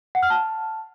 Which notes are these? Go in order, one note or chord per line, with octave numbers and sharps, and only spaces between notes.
F#5
F6
A5